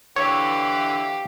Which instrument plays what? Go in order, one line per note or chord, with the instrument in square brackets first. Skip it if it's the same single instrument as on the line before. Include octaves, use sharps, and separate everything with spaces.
[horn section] D3 E3 [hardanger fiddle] G4 F5 [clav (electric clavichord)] C#5